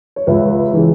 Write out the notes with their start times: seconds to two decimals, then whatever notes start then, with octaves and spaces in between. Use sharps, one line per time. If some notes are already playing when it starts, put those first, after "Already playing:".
0.16 C#5
0.27 C#2 B4 E5
0.73 C#3 E3